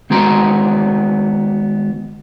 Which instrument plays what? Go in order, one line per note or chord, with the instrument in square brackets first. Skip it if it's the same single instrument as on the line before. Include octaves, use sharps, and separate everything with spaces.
[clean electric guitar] D#3 G#3 B3 F#4 A#5 C6